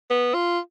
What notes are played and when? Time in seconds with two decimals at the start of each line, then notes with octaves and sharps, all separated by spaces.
0.10 B3
0.34 F4